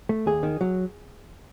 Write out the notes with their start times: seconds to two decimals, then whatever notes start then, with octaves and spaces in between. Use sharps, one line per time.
0.09 A3
0.26 D#2 G#4
0.43 D#3
0.61 F#3